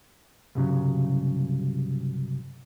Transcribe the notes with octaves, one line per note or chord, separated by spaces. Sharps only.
C2 G2 C#3 F#3